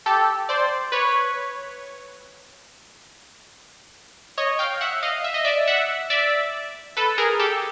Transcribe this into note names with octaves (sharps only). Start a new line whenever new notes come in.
G4 A4
C5 D5
B4 C#5
C#5 D#5
F5 G5
E5 F#5
D#5 F5
E5
D#5
D5 E5
E5 F#5
D5 E5
A4 B4
G#4 A#4
G4 A4